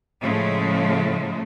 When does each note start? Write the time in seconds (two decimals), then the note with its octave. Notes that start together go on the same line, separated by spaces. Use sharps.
0.22 A2 C#3 F3 G#3 A3